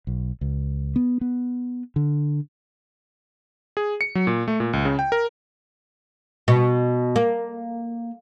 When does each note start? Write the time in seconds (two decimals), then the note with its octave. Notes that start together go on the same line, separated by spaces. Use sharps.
0.07 B1
0.41 C#2
0.96 B3
1.21 B3
1.96 D3
3.77 G#4
4.01 C#7
4.15 F#3
4.27 A#2
4.48 A3
4.60 A#2
4.73 C#2
4.85 C#3
4.99 G5
5.12 A#4
6.48 B2
7.16 A#3